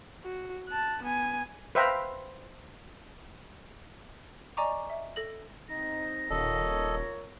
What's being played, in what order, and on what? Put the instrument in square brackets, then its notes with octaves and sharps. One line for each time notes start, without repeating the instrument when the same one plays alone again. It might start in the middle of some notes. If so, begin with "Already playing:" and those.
[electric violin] F#4
A5 F#6
B3 G#5
[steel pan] B4 C5 E5 F5 G5 A#5
[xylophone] D5 D#5 G#5 A#5 C#6 D6
E5
A4 A#6 F#7
[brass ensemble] C4 D#4 [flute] A#6
[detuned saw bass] D#1 [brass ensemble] F4 A#4 C#5 [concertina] A4 D#5